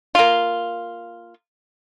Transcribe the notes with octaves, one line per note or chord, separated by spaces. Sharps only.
A#3 F4